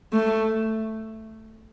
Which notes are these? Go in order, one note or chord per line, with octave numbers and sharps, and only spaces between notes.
A3